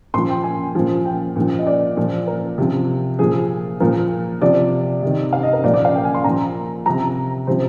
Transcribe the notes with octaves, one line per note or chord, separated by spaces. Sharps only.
A#2 F3 C6
G5
G#5
A#2 F3
G5
A#2 F3
D#5
D5
A#2 F3
A#4
C3 F3
A#2 F3 G#4
A#2 F3 A#4
C3 F3 D5
C3 D#3
F5
D#5
A#4
A#2 F3 D5
D5
F5
G5
G#5
C6
A#2 F3 A#5
C3 F3 A#5
C3 F3 C5